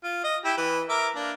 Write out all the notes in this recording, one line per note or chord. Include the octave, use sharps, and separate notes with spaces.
F4
D#5
E4 G4
E3 B4
A#4 E5 D6
A#3 D4